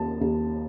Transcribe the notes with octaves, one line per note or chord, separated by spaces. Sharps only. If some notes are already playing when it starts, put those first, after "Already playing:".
Already playing: D#2 A5
D#2